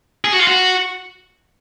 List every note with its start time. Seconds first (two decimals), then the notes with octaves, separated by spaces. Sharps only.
0.25 G#4
0.33 F#4
0.40 F4
0.48 F#4